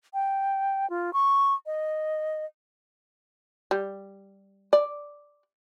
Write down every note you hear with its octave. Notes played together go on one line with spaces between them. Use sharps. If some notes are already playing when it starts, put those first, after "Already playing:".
G5
F4
C#6
D#5
G3
D5